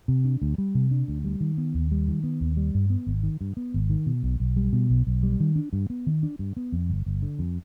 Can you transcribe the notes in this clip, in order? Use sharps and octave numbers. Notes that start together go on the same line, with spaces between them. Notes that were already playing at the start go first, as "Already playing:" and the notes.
C3
D4
D2
G3
C3
D4
D2
G3
D#3
B3
D#2
G3
D#3
B3
D#2
G3
G2
B3
G#1
D#3
G2
B3
G#1
D#3
B2
B1
B1
G3
B2
B1
B1
G3
D#3
D4
G2
B3
D#3
D4
G2
B3
F2
G1
G1
D3
F2